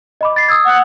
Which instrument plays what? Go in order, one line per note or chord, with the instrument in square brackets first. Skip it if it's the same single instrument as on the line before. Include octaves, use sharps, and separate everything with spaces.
[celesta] D#5 B5 D6
A6 C7
D#6 E6 G#6
[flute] F#5